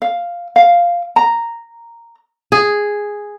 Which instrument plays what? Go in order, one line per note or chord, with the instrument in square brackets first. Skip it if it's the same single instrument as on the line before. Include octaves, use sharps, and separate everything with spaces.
[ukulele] F5
F5
A#5
[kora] G#4